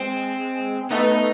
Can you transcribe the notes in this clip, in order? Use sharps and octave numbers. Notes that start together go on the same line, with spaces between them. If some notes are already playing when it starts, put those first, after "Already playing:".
Already playing: G#3 C4
A3 B3 D#4